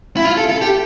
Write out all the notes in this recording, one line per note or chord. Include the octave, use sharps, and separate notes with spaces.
E4
F4
A4
A4
G4